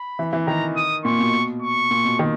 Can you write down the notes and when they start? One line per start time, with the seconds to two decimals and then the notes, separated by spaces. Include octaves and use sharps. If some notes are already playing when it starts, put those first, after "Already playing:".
Already playing: B5
0.19 E3
0.33 E3
0.47 D#3 A#5
0.76 D#6
1.05 A#2 C#6
1.19 B2
1.62 C#6
1.91 A#2
2.05 B2
2.19 D#3